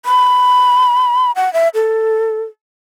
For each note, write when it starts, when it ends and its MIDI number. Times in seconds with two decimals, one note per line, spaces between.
0.06 1.31 83
1.36 1.52 78
1.53 1.69 76
1.75 2.43 69